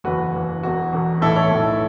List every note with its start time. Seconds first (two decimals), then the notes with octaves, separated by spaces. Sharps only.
0.04 F#1 E2 E3 F#4 B4
0.35 F#1 E2 E3
0.63 E1 E2 B2 F#4
0.93 E1 E2 B2
1.22 B1 A2 E3 E4 A4
1.36 A4 C#5
1.51 B1 A2 E3